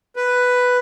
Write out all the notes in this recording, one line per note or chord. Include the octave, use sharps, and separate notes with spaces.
B4